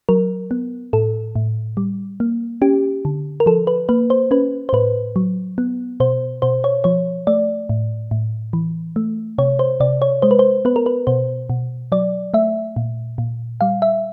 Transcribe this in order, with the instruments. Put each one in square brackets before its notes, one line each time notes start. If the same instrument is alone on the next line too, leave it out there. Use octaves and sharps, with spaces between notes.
[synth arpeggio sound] F#3 A#4
B3
A2 A4
A2
G3
A#3
C#4 G4
D3
A#4
F3 A4
B4
A#3 B4
C5
C#4 B4
C5
A2 B4
F#3
B3
B2 C5
B2 C5
C#5
F3 C#5
A3 D5
A2
A2
E3
A3
C3 C#5
C5
C3 D5
C#5
G#3 C5
B4
C5
B3 B4
A#4
B4
B2 C5
B2
F#3 D5
A3 E5
A#2
A#2
G3 F5
E5